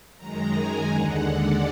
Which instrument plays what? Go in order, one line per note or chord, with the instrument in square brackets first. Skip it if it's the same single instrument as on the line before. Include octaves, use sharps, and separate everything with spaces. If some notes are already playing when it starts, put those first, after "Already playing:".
[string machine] F#2 D#3 G#3 A#5
G#5
D#2 D3 G#3 F#5
D5